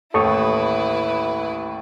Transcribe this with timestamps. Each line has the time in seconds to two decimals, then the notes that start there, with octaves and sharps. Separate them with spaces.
0.14 A1 D#2 E4 A4 B4 C#6 D#6